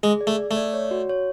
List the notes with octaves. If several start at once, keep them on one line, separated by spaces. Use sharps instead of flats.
G#3 G#4
D5
A3
D5
A3
D5
C#5
F#4
C#5